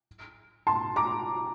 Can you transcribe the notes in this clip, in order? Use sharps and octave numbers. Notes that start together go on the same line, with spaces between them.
A5 C6
A#5 D6